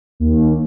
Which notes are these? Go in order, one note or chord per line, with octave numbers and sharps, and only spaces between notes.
D#2